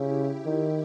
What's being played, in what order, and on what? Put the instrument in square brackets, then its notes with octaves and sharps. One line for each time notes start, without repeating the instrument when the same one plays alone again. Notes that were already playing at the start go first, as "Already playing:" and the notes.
Already playing: [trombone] C#3 [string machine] E4 G4
[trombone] D#3